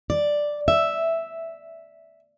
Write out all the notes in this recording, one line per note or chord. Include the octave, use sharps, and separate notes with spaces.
D5
E5